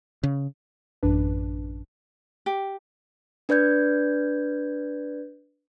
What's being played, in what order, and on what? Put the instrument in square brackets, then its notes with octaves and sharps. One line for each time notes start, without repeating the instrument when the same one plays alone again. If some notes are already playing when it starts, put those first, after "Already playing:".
[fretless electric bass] C#3
[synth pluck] A1 F#2 D4 B4
[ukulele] G4
[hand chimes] D4 B4 D5 G6 G#6